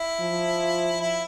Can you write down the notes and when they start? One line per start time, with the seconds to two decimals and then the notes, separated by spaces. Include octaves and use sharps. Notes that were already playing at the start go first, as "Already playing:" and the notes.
Already playing: E4
0.20 F3
1.01 E4